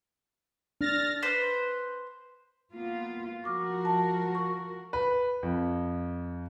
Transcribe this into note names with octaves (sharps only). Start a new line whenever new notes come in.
D4 F6 A6 A#6
B4 C5 C6
A#3 B3 F4
F3 F#4 A#4 C#6 D6 F6
A5
C#6
B4
F2